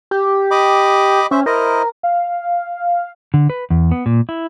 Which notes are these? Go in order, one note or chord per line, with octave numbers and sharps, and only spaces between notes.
G4
D#5 B5 D6
C#4 C5 E5
E4 A#4 C5 D#5
F5
D3
B4
E2
B3
A#2
E4